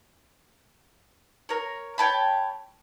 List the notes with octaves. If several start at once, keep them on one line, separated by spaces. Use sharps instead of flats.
A#4 C#5
C#5 G5 A5 B5